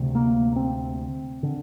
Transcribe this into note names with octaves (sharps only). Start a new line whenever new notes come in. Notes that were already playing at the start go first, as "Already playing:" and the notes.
Already playing: D2 C3
A#3
C4
D3